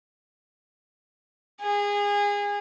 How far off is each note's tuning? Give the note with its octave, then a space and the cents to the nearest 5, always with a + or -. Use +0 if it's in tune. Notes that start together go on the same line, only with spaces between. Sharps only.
G#4 -25